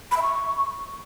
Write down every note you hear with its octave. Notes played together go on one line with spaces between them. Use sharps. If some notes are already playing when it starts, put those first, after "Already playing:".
B5
E5
C#6